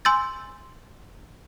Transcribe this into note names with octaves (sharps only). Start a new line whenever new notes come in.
G#5 C6 E6 G6 A6